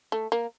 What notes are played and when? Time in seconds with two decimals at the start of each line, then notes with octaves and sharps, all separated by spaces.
0.12 A3
0.32 A#3